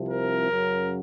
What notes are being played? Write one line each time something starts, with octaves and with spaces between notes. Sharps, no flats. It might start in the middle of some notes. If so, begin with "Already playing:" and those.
Already playing: C2 C3 F3
A#4
F#2 C#3 F#3